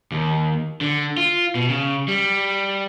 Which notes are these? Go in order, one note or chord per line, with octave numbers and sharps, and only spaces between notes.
D#2
D3
F4
B2
C#3
G3